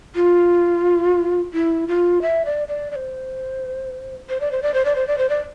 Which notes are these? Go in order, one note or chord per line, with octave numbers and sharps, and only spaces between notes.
F4
E4
F4
E5
D5
D5
D5
C5
C5
D5
C5
D5
C5
D5
C5
D5
C5
D5